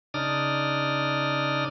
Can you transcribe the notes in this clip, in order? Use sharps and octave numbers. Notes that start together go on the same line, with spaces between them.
C#3 D4 D#4 D5 D#6 F6